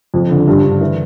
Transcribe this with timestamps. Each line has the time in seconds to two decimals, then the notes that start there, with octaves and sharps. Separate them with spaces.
0.14 F2
0.30 D3
0.47 G2
0.63 D3
0.81 E3